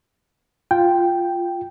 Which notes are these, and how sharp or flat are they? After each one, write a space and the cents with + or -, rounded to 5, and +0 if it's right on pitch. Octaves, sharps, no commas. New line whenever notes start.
F4 +0 G5 +0